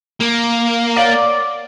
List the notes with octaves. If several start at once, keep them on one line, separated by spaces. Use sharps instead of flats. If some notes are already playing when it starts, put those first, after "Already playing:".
A#3
C#5 D5 F5 F#5